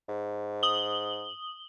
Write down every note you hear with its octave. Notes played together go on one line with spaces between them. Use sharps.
G#2
D#6 F#7 G7